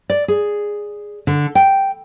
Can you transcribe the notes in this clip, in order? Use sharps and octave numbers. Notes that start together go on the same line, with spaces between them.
D5
G#4
D3
G5